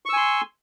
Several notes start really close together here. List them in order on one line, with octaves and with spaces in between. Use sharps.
C#6 E6 G#5 C6